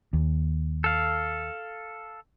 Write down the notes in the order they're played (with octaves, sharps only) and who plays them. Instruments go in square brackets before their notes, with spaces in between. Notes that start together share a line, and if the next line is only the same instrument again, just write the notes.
[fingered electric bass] D#2
[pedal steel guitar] A4 F5